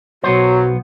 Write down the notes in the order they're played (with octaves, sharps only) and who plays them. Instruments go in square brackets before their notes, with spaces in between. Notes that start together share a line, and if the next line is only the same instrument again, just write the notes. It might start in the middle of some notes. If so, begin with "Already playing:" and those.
[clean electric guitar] B1 B3 C5 [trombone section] F#3 [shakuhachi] F#4